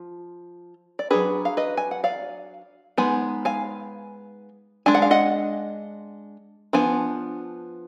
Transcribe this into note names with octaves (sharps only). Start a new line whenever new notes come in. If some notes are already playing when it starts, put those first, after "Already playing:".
Already playing: F3
D5
F#3 D4 G#4 B4
F5
B4 D#5
G#5
F#5
D5 F5
G#3 B3 D#4 G#5
F5 G#5
G#3 D4 G#5
F#5
F5
D#5 F#5
F3 B3 D4 G#5